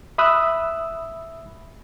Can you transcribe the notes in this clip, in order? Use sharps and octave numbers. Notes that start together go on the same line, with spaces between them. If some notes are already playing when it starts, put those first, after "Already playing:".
E5 B5 D#6 E6 F#6